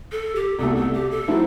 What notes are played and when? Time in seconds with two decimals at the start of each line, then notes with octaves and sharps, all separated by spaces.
0.12 A4
0.36 G4
0.58 C2 B2 A3 A4
0.76 A4
0.94 G4
1.11 A4
1.28 F#3 A3 C4 E4